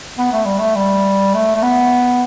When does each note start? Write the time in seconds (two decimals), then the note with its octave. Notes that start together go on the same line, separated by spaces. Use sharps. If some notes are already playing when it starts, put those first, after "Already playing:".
0.18 B3
0.32 A3
0.45 G3
0.59 A3
0.75 G3
1.34 A3
1.55 A3
1.62 B3